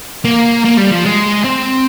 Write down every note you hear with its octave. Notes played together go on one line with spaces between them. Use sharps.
A#3
A#3
G3
F3
G#3
C4